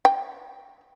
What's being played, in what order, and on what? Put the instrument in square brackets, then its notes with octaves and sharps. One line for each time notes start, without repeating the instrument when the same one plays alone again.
[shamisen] G5